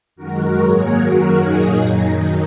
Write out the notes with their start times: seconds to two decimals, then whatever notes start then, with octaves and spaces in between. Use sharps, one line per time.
0.16 F#2 D#3 G#3 F#4 A#4
0.57 G#2 F#3 A#3 G#4 C#5
0.97 F#2 D#3 F#3 F#4 A#4
1.38 A#2 F#3 A#3 D#4 G#4
1.79 F#2 D#3 F#3 D#4